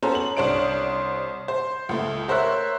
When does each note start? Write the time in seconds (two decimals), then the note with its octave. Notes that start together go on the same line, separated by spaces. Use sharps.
0.02 B3 C#4 F#4 A4 C5 A#5
0.15 F#7
0.37 C2 D4 C5 C#5 D7
1.48 C5
1.89 C#2 A3
2.28 A#4 C5 C#5 E5 F#6